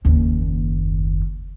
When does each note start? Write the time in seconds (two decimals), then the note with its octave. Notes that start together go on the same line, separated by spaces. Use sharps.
0.05 F#1 D#2